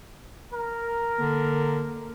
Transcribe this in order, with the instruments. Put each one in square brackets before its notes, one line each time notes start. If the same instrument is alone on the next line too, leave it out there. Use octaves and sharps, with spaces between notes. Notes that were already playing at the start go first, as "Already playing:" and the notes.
[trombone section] A#4
[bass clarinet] D3 [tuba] A#3